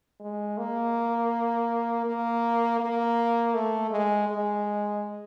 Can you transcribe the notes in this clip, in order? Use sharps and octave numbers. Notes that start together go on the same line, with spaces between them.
G#3
A#3
A#3
A#3
A3
G#3
G#3